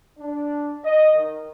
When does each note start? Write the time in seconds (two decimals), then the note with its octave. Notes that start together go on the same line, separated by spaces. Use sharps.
0.18 D4
0.84 D#5
1.14 D#3